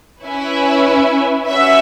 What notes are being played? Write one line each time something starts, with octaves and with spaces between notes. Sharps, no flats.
C#4 E4 B4 E5 G#5
C#4 F#4 B4 E5